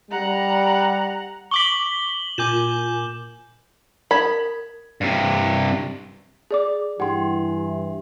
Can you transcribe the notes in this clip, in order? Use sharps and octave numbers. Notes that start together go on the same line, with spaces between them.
G3 F#5 A#5
C#6 D6 B6 F#7 G7
A#2 G#5 D6 G6 E7
A#4 B5 G#6
G2 C3
G#4 D5 D6
G2 E3 G4 F#5 G5 C6